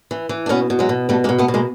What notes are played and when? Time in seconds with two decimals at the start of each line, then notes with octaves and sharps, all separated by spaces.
0.11 E3
0.29 E3
0.46 D4
0.49 B2 B3 C#4
0.70 B2
0.79 F#3 G#3
0.89 B2
1.09 B2 G3 A3
1.24 G#3 A#3
1.29 B2
1.38 A3 B3
1.48 B2
1.54 G#3 A#3